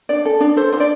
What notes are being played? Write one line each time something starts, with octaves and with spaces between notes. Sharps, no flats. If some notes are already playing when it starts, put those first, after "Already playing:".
D4 D5
A4
D4 D5
A4 C5
D4 C5
D5